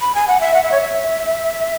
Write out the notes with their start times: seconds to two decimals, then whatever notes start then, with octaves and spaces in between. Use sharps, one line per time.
0.01 B5
0.15 G#5
0.28 F#5
0.40 E5
0.54 F#5
0.63 E5
0.72 C#5
0.81 E5